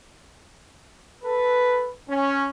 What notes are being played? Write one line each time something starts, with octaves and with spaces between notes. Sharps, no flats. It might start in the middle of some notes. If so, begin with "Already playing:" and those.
A4 B4
C#4